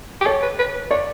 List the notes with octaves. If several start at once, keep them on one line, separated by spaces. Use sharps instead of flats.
G4
A4 C#5
B4
B4
C#5 D5